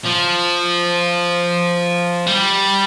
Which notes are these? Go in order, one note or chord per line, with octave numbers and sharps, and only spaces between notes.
F3
G3